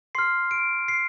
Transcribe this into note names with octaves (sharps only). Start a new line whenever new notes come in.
C6 F6 C7
D7
C7